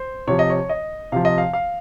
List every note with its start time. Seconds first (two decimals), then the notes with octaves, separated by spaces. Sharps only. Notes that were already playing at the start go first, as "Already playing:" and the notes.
Already playing: C5
0.27 C3 F3 C#5
0.39 D#5
0.50 C#5
0.69 D#5
1.12 C3 F3 F5
1.25 D#5
1.38 F5
1.53 F5